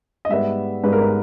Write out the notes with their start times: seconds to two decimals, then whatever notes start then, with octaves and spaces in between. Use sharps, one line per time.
0.25 D#5
0.29 G#2 G3 B3 E5
0.84 G#2 G3 B3 B4
0.93 A#4
1.02 B4